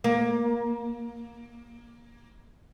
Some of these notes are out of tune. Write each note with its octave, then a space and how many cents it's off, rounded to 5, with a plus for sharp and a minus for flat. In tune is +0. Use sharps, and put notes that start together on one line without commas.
A#3 +20